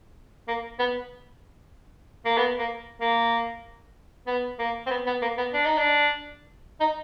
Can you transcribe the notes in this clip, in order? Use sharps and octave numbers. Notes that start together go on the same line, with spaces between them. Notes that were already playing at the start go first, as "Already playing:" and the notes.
A#3
B3
A#3
B3
A#3
A#3
B3
A#3
C4
B3
B3
A#3
B3
D4
D#4
D4
D#4